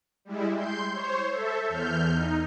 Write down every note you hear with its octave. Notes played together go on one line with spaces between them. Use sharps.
G3 G#3 E4
C6 G6
C5 C#5
A4 E5
E2 F6 G6
D#4